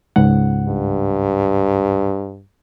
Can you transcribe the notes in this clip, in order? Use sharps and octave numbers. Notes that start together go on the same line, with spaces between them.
C#2 G#2 F#5
G2